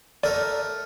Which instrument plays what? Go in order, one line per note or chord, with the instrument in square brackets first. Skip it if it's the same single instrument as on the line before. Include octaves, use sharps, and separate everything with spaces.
[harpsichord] A3 A#4 [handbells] D5